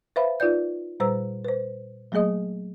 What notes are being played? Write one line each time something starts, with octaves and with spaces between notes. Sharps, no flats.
B4 C5 E5 F5 B5
D#4 F4 B4 D5 G6
A#2 G3 B4 C5 A#5 E6
B4 C5
F#3 A3 A#3 G#4 D#5 D#6